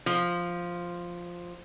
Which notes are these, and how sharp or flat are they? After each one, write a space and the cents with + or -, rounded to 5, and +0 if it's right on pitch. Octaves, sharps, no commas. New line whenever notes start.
F3 +0